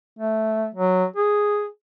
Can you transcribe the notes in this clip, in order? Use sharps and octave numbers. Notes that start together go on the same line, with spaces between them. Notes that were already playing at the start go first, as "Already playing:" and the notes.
A3
F#3
G#4